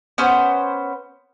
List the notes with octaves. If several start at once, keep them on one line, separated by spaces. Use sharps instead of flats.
B3 C#4 C5